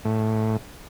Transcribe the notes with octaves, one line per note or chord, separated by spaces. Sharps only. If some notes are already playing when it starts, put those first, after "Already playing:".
A2